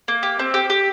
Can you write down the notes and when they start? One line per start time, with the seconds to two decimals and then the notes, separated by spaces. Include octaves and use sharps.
0.08 A#3
0.23 G4
0.39 C4
0.54 G4
0.70 G4